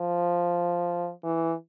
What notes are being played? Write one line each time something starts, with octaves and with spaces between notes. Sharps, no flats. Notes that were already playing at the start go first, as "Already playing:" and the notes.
Already playing: F3
E3